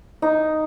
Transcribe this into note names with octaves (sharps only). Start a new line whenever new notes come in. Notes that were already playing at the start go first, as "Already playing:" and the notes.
D#4